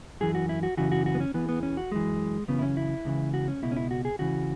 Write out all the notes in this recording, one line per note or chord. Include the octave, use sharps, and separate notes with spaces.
F#2 E3 G#4
F#4
E4
F#4
F#2 C#3 E3 F#4
F#4
F#4
B3
C#4
E2 E3 B3
B3
C#4
F#4
F#2 E3 G#3
F#2 C#3 E3 B3
E4
C#4
E4
C#2 C#3 E3
F#4
C#4
C#2 B2 E4
C#4
E4
F#4
G#4
C#2 C#3 E3 F#4